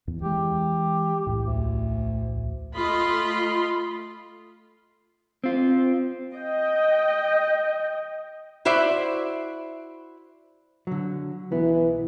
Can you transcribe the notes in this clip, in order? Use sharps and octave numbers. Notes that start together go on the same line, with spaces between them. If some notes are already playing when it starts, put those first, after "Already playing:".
E2
E3 G#3 G4
B1 E2 A2
D2
A3 F4 D#5 B5 C6
C4 F4
D#5 G5
E4 F#4 C5 D5 E5
D3 F#3
B1 E3 B3